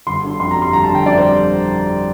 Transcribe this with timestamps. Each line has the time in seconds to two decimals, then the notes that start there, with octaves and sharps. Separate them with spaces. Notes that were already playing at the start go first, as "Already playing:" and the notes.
0.07 G1 C6
0.24 D3
0.40 F2 C6
0.51 A#5
0.56 G3
0.62 C6
0.73 G1 A#5
0.84 A5
0.89 D3
0.95 G5
1.06 F2 D5
1.17 C5
1.23 G3